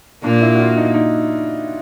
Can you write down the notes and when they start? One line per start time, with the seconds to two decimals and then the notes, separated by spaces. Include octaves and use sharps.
0.23 A#2 A#3 D4
0.42 E4
0.55 F#4
0.59 F4
0.77 D#4
0.94 D#4